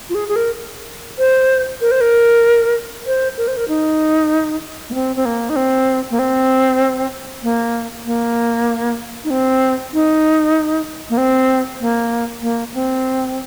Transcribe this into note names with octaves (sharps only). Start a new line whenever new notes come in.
F4
G#4
G#4
A#4
C5
A#4
C5
A#4
C5
A#4
C5
A#4
D#4
A#3
C4
C4
A#3
D#4
C4
A#3
C4
A#3
A#3
D#4
C4
D#4
A#3
C4
A#3
A#3
C4